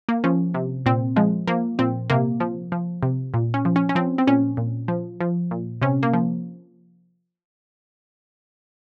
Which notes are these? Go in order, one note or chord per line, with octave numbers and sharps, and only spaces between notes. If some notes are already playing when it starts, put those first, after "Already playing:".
A#3
F3 C#4
C3
A#2 C4
F3 G#3
F3 A#3
A#2 C4
C3 A#3
F3
F3
C3
A#2
C#4
F3
C#4
C#4
F3 C4
C4
A#2 C#4
A#2
F3
F3
A#2
C3 C#4
A#3
F3